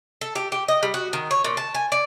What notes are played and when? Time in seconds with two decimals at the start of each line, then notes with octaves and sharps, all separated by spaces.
0.21 A4
0.35 G4
0.52 G4
0.68 D#5
0.83 G3
0.94 F#4
1.13 D#3
1.31 C#5
1.44 A#2
1.57 A5
1.74 G#5
1.92 D5